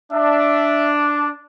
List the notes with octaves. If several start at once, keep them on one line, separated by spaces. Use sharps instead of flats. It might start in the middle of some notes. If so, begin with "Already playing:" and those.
D4 E5